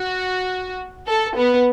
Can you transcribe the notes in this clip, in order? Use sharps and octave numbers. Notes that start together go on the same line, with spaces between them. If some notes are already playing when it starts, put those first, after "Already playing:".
Already playing: F#4
A4
B3